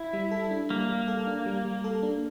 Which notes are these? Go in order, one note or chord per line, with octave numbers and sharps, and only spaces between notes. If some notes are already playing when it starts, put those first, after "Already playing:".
Already playing: E4
G3
A4
D4
G3 A#3
G3
A4
D4
G3
G3
A4
D4